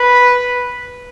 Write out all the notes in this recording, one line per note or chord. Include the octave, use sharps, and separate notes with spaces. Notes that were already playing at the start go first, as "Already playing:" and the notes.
Already playing: B4